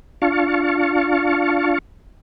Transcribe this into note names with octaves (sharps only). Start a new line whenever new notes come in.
D4 F4 F5 A5 C#6